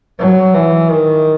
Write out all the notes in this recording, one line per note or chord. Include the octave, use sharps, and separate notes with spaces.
F#3
E3
D#3